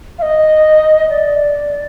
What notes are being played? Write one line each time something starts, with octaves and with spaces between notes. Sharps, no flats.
F5
D#5
D5